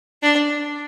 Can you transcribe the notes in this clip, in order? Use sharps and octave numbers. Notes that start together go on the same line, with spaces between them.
D4